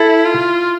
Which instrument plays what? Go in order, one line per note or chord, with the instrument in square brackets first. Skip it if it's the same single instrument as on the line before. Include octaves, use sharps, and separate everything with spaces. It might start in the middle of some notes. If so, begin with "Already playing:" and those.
Already playing: [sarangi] E4 [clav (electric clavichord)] A4
[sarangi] F4